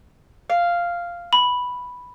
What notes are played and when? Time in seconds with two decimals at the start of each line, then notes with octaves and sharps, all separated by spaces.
0.50 F5
1.33 B5